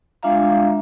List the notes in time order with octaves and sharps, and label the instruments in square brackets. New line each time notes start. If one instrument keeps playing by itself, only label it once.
[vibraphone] G#3 D4 F4 E5 F5 A#5